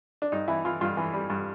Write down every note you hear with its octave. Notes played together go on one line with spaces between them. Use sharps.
D4
G2 D#4
E3 E4
E3 F4
G2 F4
E3
G3
G2